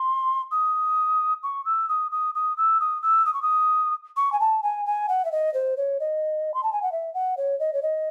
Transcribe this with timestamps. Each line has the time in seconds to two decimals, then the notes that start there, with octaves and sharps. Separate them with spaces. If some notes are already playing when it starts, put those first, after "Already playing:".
Already playing: C6
0.51 D#6
1.43 C#6
1.65 E6
1.89 D#6
2.11 D#6
2.35 D#6
2.57 E6
2.80 D#6
3.02 E6
3.26 D#6
3.34 C#6
3.42 D#6
4.17 C#6
4.32 G#5
4.40 A5
4.63 G#5
4.86 G#5
5.09 F#5
5.25 E5
5.32 D#5
5.54 C5
5.77 C#5
6.00 D#5
6.54 C6
6.63 A5
6.73 G#5
6.82 F#5
6.92 E5
7.14 F#5
7.37 C#5
7.60 D#5
7.73 C#5
7.83 D#5